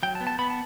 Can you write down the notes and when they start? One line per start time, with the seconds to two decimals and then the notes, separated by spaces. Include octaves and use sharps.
0.03 F#3 G5
0.15 A5
0.21 B3
0.27 A5
0.39 B3 B5
0.50 A5